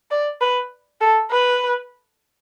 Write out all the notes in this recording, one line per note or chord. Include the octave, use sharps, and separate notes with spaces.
D5
B4
A4
B4